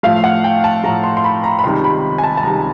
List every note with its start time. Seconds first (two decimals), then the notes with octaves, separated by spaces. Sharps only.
0.03 A2 F3 A3 F5
0.24 F#5
0.44 G5
0.64 A5
0.84 A2 F3 A3 A#5
1.03 C6
1.17 C6
1.24 B5
1.44 A#5
1.59 B5
1.64 C#2 C3 D#3 G3 C6
1.84 B5
2.18 G#5
2.24 A5
2.37 A5
2.43 C#2 C3 D#3 G3 A#5